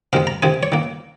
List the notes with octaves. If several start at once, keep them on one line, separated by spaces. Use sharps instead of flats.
C3 D#3 G#3 F5
A#5
C3 D#3 G#3 G#5
C#5
D#3 A#3